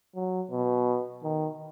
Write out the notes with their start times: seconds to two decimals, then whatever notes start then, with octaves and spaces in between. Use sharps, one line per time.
0.16 F#3
0.51 B2
1.24 D#3